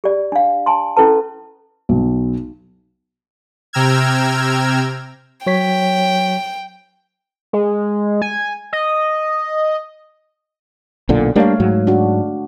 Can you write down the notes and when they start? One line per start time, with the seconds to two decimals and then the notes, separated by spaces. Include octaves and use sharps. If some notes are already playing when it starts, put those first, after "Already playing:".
0.04 G4 D5
0.32 D4 F5
0.66 G#5 A5 C6
0.97 C#4 E4 A4 B4 A5
1.89 B1
3.73 C3 G5 A#5 E6 F6 G#6
5.46 F#3 C#5 G5 B6
7.53 G#3
8.22 G#5
8.73 D#5
11.09 B1 A#2 D3
11.36 G3 A3 A#3 D4 C#5 F5
11.60 G#2 F#3
11.87 D4 F#4